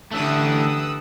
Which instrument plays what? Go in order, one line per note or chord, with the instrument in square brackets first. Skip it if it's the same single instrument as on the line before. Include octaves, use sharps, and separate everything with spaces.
[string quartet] D3 G3 [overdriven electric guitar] E3 A3 [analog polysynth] D#6 E6 F#6